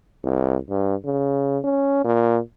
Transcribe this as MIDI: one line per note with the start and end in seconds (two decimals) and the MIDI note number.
0.24 0.57 36
0.70 0.95 43
1.05 1.59 49
1.64 2.00 61
2.04 2.39 46